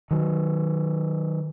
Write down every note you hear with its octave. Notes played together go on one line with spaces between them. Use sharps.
D#3 F#3